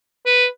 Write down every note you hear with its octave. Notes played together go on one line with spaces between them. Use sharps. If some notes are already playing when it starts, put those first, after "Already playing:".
B4